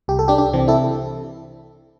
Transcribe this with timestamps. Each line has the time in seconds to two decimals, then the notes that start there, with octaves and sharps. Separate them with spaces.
0.08 C2 G4
0.19 A4
0.28 D4 G4
0.38 D4 G4
0.53 C3 E3 C4
0.68 E4 A4